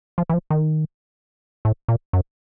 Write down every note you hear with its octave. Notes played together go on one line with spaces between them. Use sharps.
F3
E3
F3
D#3
A2
A#2
F#2